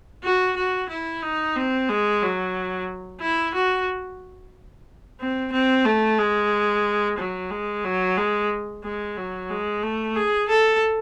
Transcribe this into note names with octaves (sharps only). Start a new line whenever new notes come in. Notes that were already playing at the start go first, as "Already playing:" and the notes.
F#4
F#4
E4
D#4
C4
G#3
F#3
E4
F#4
C4
C4
A3
G#3
F#3
G#3
F#3
G#3
G#3
F#3
G#3
A3
G#4
A4